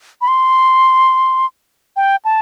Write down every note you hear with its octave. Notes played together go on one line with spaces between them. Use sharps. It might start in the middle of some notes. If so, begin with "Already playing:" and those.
B5
C6
G5
A5